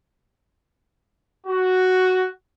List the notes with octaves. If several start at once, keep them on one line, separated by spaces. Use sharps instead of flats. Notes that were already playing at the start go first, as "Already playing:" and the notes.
F#4